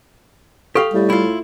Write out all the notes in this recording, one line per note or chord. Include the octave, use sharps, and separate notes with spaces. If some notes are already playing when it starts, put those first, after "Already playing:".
G4 A4 F5 C#6
A2 G3
E4 F4